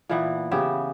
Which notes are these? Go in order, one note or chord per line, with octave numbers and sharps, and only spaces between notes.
A#2 E3 B3
C#3 B3 G4 E5